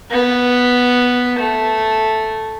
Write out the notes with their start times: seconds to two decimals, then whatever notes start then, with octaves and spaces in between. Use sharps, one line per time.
0.11 B3
1.39 A3